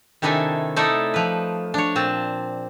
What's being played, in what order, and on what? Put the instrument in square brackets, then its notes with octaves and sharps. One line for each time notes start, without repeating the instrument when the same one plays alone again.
[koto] C3 D#3 D4 E4 A4 G#5
A3 D#4 E4 A4 D5 E5
F3 B4
D4 C#5
A#2 C4 A5